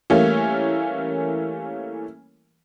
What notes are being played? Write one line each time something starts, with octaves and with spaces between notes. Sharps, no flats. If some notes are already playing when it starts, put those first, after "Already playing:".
E3 G3 A3 A#3 C#4